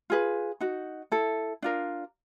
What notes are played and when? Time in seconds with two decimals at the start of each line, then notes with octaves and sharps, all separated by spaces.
0.10 F4 G#4 B4
0.61 D#4 F#4
1.12 E4 A4
1.63 D4 F4 A#4